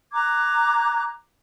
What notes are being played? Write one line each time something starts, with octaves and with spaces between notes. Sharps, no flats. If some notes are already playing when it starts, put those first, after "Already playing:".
A#5 D6 F#6 G#6